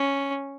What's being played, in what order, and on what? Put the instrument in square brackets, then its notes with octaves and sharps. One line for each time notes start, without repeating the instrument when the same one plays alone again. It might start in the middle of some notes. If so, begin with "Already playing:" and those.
Already playing: [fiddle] C#4